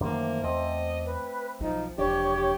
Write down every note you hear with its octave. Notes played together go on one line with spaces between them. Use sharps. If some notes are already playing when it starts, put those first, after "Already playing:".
F#2 D#3 E3 A3 A#3 C5 D5
E2 C4 A4 D#5
B4
B1 F3 D#4
E1 F3 D4 G4 C#5 D5
G4